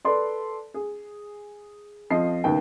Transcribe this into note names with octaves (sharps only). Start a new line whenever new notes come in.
A4 B4 D5 C6
G#4
F2 F3 D#5 C7
F#1 D#2 B3 G5